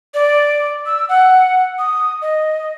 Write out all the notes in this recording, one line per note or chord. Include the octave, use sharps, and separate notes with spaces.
D5
E6
F#5
D#6
D#5